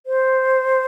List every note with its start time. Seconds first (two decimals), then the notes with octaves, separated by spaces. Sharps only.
0.06 C5